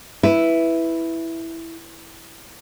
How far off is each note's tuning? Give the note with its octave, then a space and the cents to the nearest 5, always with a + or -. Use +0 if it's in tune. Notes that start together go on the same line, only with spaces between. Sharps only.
E4 +0 B4 +0